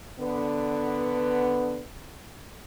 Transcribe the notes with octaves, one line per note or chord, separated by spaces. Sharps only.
D3 B3